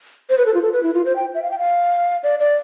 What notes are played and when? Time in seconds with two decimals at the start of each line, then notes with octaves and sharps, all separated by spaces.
0.30 C5
0.38 B4
0.46 A4
0.54 F4
0.62 A4
0.73 B4
0.83 E4
0.94 F4
1.05 C5
1.16 G5
1.34 E5
1.43 F5
1.51 G5
1.59 F5
2.23 D5
2.39 D5